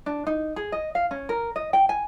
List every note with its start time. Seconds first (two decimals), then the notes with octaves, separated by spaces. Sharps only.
0.06 D4
0.27 D#4
0.56 G#4
0.72 D#5
0.95 F5
1.11 C#4
1.29 A#4
1.56 D#5
1.73 G5
1.89 G#5